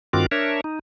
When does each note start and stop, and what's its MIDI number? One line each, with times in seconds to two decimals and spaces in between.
0.13 0.26 43
0.13 0.26 51
0.13 0.26 60
0.13 0.26 65
0.13 0.26 66
0.13 0.26 86
0.31 0.61 62
0.31 0.61 70
0.31 0.61 73
0.31 0.61 76
0.64 0.79 63